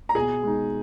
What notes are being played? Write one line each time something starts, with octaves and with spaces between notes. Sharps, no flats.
A#5
B2 G#4 G#5
G#3 D#4